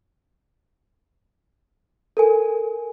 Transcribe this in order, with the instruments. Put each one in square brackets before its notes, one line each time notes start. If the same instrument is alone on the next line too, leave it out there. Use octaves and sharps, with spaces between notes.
[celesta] A4 A#4 G#5